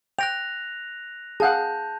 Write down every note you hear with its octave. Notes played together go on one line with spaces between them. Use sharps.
G5 F#6 A#6 F7
G#4 F5 F#5 A5 G6